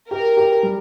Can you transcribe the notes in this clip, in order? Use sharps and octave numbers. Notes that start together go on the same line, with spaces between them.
G4 A#4
G4
G3